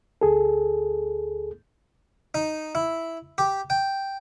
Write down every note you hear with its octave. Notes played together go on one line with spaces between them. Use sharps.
D2 G#4 A4
D#4
E4
G4
G5